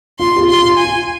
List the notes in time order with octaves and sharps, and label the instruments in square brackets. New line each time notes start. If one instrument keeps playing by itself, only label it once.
[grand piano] F4 [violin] C6
[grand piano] G4
F4
[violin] C6
[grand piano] F4
[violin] G#5
[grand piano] F4